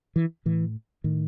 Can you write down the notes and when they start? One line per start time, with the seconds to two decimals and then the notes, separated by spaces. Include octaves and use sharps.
0.16 E3
0.45 A2 E3
1.04 A2 D#3